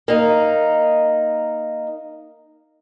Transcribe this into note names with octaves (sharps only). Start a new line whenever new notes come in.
A#3 D#4